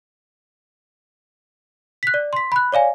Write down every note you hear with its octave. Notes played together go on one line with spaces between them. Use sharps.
F#6 B6
D5
C6 B6
B5 F#6
C#5 D5 F5 G#5